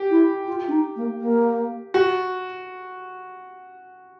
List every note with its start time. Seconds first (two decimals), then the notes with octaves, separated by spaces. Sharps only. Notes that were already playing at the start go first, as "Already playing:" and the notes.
Already playing: G4
0.10 E4
0.47 F4
0.68 D4
0.72 D#4
0.96 A#3
1.21 A#3
1.94 F#4